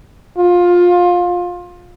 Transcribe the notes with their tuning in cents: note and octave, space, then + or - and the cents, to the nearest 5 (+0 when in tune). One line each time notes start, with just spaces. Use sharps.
F4 +20